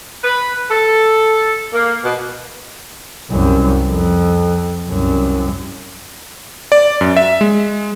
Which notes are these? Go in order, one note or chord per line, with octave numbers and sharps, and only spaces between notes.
B4
A4
A#3
B2
C2 F#2
F2
C2 F#2
D5
F#2
E5
G#3